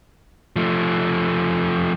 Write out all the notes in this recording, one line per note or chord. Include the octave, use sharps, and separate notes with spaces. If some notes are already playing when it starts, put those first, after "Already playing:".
F3 A3